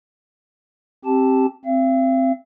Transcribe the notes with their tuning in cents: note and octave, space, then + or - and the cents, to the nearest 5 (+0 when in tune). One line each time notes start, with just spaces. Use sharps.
C4 +15 G4 -5 A5 -5
C4 +0 F5 -45